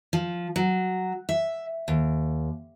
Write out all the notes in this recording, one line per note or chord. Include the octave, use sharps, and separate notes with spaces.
F3
F#3
E5
D#2